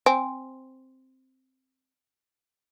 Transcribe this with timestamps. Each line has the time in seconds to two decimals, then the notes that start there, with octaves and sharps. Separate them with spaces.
0.06 C4 G#5